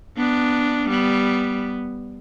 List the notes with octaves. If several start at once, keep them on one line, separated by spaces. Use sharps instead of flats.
B3 D4
G3 B3